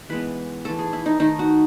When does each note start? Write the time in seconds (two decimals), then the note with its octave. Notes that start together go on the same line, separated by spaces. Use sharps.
0.09 E3 G#3 B3 B4
0.65 E3 A3 A4
0.79 G#4
0.93 E4
1.06 D#4
1.20 D#3 A3 D#4
1.39 F#4